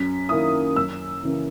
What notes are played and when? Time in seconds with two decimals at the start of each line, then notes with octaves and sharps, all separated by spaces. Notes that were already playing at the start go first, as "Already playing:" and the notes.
Already playing: F#2 B6
0.29 D#3 A#3 E4 D#6
0.76 F#2 E6
1.24 C#3 E3 A#3